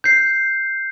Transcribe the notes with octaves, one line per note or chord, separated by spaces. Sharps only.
G6 C7